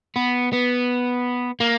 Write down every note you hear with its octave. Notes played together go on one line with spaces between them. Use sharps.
B3
B3
A#3